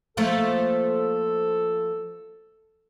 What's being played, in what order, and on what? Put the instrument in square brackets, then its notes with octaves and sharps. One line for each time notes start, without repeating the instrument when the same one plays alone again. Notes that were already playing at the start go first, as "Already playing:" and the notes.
[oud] F3 A3 A#3 [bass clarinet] A4